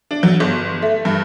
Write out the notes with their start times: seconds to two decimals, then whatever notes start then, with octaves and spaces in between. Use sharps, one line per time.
0.11 D4
0.23 F#3
0.40 G1
0.82 A3
1.05 G2